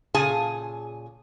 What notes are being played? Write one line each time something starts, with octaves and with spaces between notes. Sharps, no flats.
A#2 C#3 G#4 G#5 A5